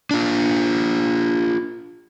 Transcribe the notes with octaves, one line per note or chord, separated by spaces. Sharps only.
D4 F4